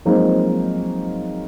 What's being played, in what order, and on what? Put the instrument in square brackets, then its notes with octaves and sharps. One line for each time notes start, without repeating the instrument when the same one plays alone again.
[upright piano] F3 F#3 G#3 A#3 C4 D#4